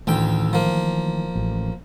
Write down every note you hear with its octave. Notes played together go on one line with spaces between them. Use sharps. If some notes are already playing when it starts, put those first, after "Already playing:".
A1 D2 D#3 E3 A3 G5
F3 A#3
A1